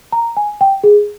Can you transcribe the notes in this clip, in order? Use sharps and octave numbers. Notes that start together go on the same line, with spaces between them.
A#5
G#5
G5
G#4